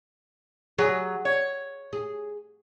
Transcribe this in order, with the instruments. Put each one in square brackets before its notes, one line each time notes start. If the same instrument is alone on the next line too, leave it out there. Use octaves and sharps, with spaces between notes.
[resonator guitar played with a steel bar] F#3 [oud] G#4
[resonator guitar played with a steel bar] C#5
[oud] G#4